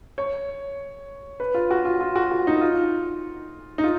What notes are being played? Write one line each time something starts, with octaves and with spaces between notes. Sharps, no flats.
C#5
B4
F4
F#4
F4
F4
F#4
F4
D#4
F4
D#4
F4